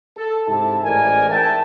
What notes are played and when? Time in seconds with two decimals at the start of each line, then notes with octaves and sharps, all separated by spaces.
0.17 A4
0.46 G#2 C3 E4 A5
0.83 A1 G#2 A3 A#4 D5 G#5
1.30 A#4 E5 G5 A5